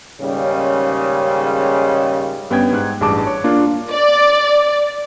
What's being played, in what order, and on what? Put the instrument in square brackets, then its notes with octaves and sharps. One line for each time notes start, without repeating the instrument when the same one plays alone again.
[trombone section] D#2 G#2 C#3 G3 G#3 C#4
[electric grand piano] G2 B3 C#4 G5 G#6
G#2 F#6
A1 G2 G#4 A5 D6
C#5
A#3 D4 F4
[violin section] D5